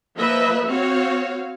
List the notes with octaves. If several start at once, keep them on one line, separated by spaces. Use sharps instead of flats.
F3 A#3 B4 D#5 E5
C4 F#4 C#5 F5